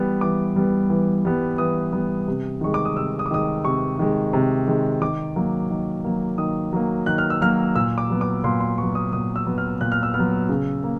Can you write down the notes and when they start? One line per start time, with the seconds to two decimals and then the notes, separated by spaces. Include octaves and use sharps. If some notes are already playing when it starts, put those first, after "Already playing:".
Already playing: E3 G3 B3
0.21 E3 D6
0.56 G3 B3
0.90 E3
1.25 G3 B3
1.58 E3 D#6
1.93 G3 B3
2.28 C3
2.61 D#3 G#3 C#6
2.74 D6
2.85 D#6
2.96 C3 E6
3.19 D#6
3.26 D6
3.31 D#3 G#3 D#6
3.64 C3 C#6
3.99 D#3 G#3
4.33 C3
4.67 D#3 G#3
5.01 D#3 D6
5.36 F#3 A#3
5.70 D#3
6.04 F#3 A#3
6.38 D#3 D#6
6.73 F#3 A#3
7.06 D#3 F#6
7.18 F6
7.30 E6
7.41 F#3 A#3 F6
7.75 A#2 E6
7.98 D6
8.10 F#3 B3
8.21 D6
8.44 A#2 C6
8.60 C6
8.78 F#3 B3 C#6
8.95 D#6
9.13 A#2 D#6
9.36 E6
9.46 F#3 B3
9.58 F6
9.81 A#2 F#6
9.92 F6
10.03 E6
10.14 B3 F6
10.20 F#3
10.49 C#3
10.84 A#3